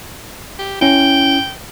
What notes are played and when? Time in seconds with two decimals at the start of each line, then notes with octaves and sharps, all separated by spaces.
0.59 G4
0.81 C#4 E4 G5